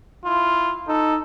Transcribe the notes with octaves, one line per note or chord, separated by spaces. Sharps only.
E4 F4
D#4 A4